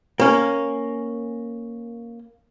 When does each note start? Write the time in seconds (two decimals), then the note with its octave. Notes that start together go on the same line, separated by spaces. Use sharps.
0.20 A#3 C#4